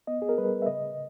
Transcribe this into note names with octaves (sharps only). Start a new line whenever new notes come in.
B3 D#5
G#4
A#4
G3 B4
E5
C#3 D#5